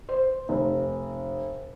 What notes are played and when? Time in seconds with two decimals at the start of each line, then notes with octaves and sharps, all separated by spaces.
0.09 C5
0.49 F1